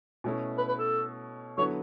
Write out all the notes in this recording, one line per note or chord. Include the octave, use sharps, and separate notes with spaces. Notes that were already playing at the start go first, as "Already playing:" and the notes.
B2 A3 C#4 E4
B4
B4
A4
D3 F#3 B3 E4 A4 C#5